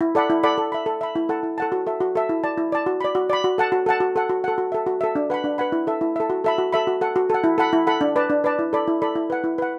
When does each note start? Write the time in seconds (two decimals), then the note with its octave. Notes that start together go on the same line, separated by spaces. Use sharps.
0.01 E4
0.15 A4 D5 F#5 B5
0.30 E4
0.43 A4 D5 F#5 B5
0.58 A4
0.72 E5 B5
0.86 A4
1.01 E5 B5
1.16 E4
1.29 A4 F#5 A5
1.43 E4
1.58 A4 F#5 A5
1.72 F#4
1.87 A4 E5
2.00 F#4
2.15 A4 E5
2.29 E4
2.44 D5 A5
2.58 E4
2.72 D5 A5
2.86 F#4
3.01 D5 B5
3.15 F#4
3.30 D5 B5
3.44 F#4
3.58 A4 F#5 A5
3.72 F#4
3.86 A4 F#5 A5
4.00 F#4
4.16 A4 F#5
4.29 F#4
4.44 A4 F#5
4.58 F#4
4.72 A4 E5
4.86 F#4
5.01 A4 E5
5.15 D4
5.30 B4 F#5 B5
5.44 D4
5.58 B4 F#5 B5
5.72 E4
5.87 A4 E5
6.01 E4
6.16 A4 E5
6.30 F#4
6.44 A4 E5 B5
6.58 F#4
6.73 A4 E5 B5
6.87 F#4
7.01 A4 F#5
7.16 F#4
7.30 A4 F#5
7.44 E4
7.58 A4 F#5 B5
7.73 E4
7.87 A4 F#5 B5
8.01 D4
8.16 B4 D5 A5
8.30 D4
8.44 B4 D5 A5
8.59 E4
8.73 A4 D5 B5
8.87 E4
9.02 A4 D5 B5
9.16 E4
9.30 B4 F#5
9.44 E4
9.58 B4 F#5